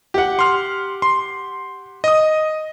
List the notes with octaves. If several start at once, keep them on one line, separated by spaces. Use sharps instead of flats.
G4 F#5
C6 F6
C6
D#5 D#6